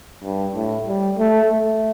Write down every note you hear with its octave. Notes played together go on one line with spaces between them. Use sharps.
G2
A2
G3
A3
A3